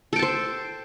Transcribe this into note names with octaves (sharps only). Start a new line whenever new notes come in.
A4 C5 G5 A5